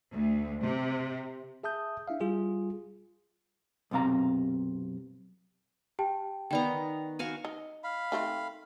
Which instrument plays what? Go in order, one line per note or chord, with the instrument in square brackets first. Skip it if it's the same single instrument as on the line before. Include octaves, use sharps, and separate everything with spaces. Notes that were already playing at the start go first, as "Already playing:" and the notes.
[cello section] D2
C3
[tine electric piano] G#4 E5 A5 D#6 G6
D4 E4 E5 F5
G3 F4 G#4
[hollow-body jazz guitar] B1 F#2 C3 F5 A#5
[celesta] G4 G5 A5
[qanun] D#3 B3 A#5 [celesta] D5 G5
[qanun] F#4 F5 G#5
[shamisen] D#4
[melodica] F5 B5
[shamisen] D#3 A3 C4